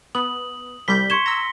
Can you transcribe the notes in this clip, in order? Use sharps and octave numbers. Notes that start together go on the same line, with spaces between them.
B3 D#6 F#7
C2 G3 G6 B6 G7
C6 C#6 G#6 C#7 E7 G7
A#5 E6 A#6